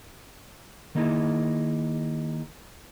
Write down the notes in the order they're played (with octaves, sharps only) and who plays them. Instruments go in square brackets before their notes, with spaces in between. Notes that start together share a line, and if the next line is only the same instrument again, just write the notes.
[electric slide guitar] D#3 A#3 D#4 E4 G#4